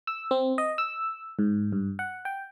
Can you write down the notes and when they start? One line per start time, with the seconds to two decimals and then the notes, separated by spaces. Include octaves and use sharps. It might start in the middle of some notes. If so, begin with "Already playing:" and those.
0.07 E6
0.31 C4
0.58 D#5
0.78 E6
1.39 G#2
1.72 G2
1.99 F#5
2.25 G5